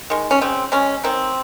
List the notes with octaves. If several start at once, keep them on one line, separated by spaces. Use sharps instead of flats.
D#3 G#3
C#4
C#3 C4
G#3 C#4
D#3 C4